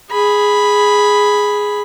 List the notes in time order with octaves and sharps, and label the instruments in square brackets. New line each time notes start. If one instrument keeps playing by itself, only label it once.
[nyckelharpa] G#4 B5